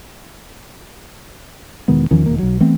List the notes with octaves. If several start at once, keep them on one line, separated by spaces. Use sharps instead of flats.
E1 D#3 G#3 B3
E2 D#3 F3 C#4
E1 D#3 A#3
B1 F#3
E3 A3 B3 C4